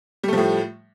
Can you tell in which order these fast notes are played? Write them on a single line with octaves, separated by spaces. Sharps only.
G3 A3 F3 A2